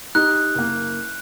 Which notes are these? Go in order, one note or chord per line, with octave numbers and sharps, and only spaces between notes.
D#4 G4 F#6
F#1 A#3